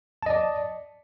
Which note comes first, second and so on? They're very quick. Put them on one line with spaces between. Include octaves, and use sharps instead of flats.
A5 D#5 D5